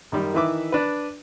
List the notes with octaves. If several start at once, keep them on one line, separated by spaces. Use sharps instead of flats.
F#2 D#3 G3
D#3 E3 B4 E5 D6
D4 B4